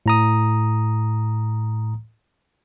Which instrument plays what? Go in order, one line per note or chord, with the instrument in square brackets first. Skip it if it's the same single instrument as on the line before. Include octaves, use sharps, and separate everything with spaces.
[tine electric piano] A2 A#5 D#6